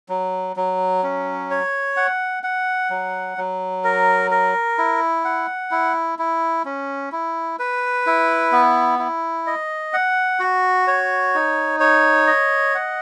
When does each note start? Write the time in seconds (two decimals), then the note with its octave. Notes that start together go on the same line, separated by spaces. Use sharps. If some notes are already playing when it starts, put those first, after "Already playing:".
0.09 F#3
0.56 F#3
1.03 C#4
1.51 C#5
1.97 F#5
2.43 F#5
2.90 F#3
3.38 F#3
3.84 A#4
4.31 A#4
4.78 E4
5.25 F#5
5.71 E4
6.19 E4
6.65 C#4
7.12 E4
7.59 B4
8.06 E4
8.52 B3
8.99 E4
9.47 D#5
9.93 F#5
10.40 F#4
10.87 C#5
11.34 D#4
11.80 C#5
12.27 D#5
12.75 F#5